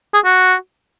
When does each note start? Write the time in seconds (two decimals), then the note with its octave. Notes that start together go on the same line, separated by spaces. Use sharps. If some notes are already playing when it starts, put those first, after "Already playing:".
0.14 G#4
0.25 F#4